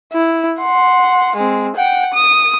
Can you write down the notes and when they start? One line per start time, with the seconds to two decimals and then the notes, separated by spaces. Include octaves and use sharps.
0.13 E4
0.60 F#5 C6
1.36 G#3 C4
1.76 F#5 G5
2.14 D#6